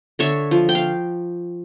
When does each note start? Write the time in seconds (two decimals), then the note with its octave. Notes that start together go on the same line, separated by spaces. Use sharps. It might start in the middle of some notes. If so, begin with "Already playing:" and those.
0.19 D3 C#5 E5
0.51 F3
0.69 G5
0.75 F5